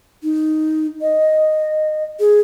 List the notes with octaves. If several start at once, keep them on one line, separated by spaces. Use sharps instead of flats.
D#4
D#5
G#4